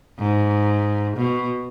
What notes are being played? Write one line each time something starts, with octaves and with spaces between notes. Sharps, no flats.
G#2
B2